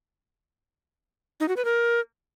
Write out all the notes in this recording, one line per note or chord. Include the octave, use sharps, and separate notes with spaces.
D#4
F#4
B4
A#4